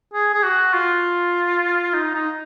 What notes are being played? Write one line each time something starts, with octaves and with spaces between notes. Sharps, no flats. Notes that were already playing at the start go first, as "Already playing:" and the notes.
G#4
G#4
F#4
F4
D#4
D#4